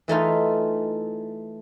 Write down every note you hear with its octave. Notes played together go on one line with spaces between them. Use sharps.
E3 A3 D#4 F4